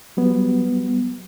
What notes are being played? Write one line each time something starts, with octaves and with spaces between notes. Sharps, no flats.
F#3 G3 B3